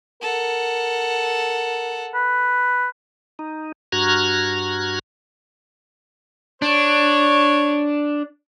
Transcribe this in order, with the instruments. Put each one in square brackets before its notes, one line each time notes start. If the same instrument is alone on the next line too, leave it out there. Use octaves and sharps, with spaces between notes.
[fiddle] A4 F#5 [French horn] A#4
[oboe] B4
[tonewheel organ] D#4
G2 F#4 A#5 F6 F#6 G#6
[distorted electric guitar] D4 [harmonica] C#5